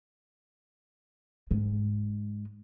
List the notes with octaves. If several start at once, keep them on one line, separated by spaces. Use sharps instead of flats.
G#2 G#3